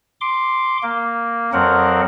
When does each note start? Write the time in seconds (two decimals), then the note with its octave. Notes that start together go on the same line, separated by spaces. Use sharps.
0.21 C6 D6
0.83 A#3
1.53 F2 F#3 C4 A#4 F#5